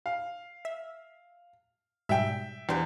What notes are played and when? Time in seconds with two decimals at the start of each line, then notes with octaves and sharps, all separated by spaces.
0.06 F5
0.65 E5
2.09 G#2 B2 G3 E5 G5
2.69 E2 D4 G4 C5